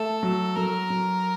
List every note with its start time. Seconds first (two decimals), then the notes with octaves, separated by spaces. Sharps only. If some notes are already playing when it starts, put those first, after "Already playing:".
Already playing: A3 A4
0.23 F#3
0.56 F#3 A#4
0.90 F#3